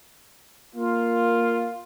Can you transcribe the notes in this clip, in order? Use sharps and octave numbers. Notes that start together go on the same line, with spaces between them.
A#3 F4